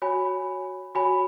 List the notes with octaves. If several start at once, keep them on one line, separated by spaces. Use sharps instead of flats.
F#4 C#5 G#5 B5
F#4 C#5 G#5 B5